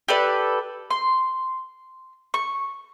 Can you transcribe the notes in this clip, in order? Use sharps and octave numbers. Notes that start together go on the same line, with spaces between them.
G4 A4 B4 D5
C6
C#6